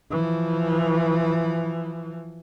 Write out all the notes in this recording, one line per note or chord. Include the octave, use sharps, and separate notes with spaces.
E3 F3